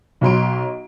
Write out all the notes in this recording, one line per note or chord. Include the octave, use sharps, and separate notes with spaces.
B1 F#3 C6 D7